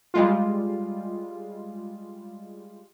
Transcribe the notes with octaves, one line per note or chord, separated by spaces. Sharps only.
G3 G#3 F4